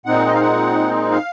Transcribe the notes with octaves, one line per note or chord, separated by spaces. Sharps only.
A#2 G#3 C4 D#4 F#5
D#5
F5
F#5
F5